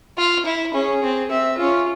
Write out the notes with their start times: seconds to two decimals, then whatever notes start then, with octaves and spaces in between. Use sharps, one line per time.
0.18 F4
0.45 E4
0.74 C#4 G#4
1.03 C4
1.30 C4 E5
1.58 C#4 F4